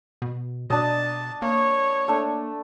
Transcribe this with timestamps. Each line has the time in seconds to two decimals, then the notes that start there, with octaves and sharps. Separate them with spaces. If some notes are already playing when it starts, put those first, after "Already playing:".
0.22 B2
0.70 B2 D4 D#5 A5
1.42 A#3 C#5
2.08 A3 D4